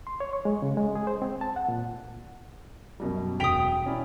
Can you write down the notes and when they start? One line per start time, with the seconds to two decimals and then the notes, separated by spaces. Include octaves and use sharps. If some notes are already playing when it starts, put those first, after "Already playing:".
0.07 C6
0.20 C#5
0.33 C#6
0.45 G#3
0.62 C#3
0.77 G#3
0.95 G#4
1.07 C5
1.22 C4
1.41 A5
1.56 F#5
1.68 A#2
3.00 F#2 B2 G3
3.40 E1 G5 D#6 B6 F7
3.86 C#4 E4 D5